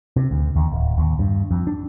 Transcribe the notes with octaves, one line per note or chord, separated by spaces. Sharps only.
C3
D2
D#2
D1
D#2
G2
F2
D4